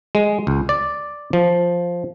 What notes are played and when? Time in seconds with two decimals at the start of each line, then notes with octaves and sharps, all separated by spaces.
0.15 G#3
0.47 C#2
0.69 D5
1.33 F3